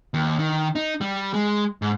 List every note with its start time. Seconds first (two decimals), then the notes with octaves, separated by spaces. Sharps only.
0.14 D#2
0.39 D#3
0.75 D#4
1.01 G3
1.34 G#3
1.82 G#2